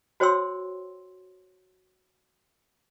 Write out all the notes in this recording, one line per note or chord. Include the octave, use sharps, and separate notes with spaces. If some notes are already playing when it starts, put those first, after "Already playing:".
F#4 C5 C#5 G5 C6 E6